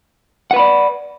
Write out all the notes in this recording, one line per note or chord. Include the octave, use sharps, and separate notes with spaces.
B4 D5 F#5 B5